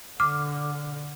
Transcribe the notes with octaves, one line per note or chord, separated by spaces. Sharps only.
D3 D6 F6